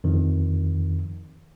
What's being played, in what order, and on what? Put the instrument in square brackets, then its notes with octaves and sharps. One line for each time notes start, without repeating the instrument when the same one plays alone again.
[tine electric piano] F2 D#3